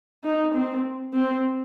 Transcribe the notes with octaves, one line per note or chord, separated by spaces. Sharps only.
D#4
C4
C4